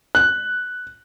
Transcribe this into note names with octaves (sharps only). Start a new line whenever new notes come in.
F#6